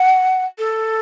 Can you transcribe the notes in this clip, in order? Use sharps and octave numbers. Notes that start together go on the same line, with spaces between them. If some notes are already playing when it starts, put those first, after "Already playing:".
Already playing: F#5
A4